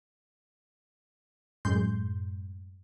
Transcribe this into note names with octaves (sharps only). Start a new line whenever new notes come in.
F#2 A2 G#3 C6 G6